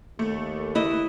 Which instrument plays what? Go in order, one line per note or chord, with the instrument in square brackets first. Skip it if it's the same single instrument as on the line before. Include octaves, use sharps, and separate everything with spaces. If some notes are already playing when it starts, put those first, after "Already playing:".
[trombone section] D#2 [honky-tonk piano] A3
[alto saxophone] E4 [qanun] B4 D#5